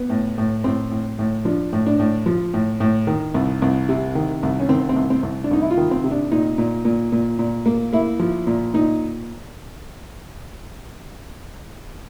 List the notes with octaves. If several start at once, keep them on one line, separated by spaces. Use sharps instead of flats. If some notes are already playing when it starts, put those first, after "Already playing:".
Already playing: B3
A2
A2
A2 C4
A2
A2
F3 D4
A2
D4
A2
F3
A2
A2
D#3
C2
C2
C3
D#3
C2
C#4
D#3 C4
C4
C2
C4
C2
D4
C2 D#4
E4
F4
D#3
C4
C3
D4
A#2 D#4
A#2
A#2
A#2
A#2
A#3
A#3 E4
F3
A#2
A#2 D#4